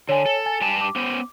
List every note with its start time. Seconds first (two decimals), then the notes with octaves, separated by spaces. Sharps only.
0.09 D3 C#5 G#5
0.26 A4
0.46 G#5 A6
0.61 G2 G4 A5
0.81 D6
0.96 B3 C#4 C5